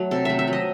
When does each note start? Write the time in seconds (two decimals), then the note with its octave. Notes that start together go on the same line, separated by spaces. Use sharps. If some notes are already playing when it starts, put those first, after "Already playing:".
Already playing: F#3 A3
0.11 C3 A4
0.25 A3 E5
0.39 E5
0.48 F#3
0.53 D#5